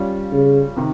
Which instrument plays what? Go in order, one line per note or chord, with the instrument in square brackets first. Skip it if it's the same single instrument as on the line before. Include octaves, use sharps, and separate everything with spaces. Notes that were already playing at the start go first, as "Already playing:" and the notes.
Already playing: [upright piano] G3 C#4 F4
[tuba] C#3
[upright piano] C3 D#3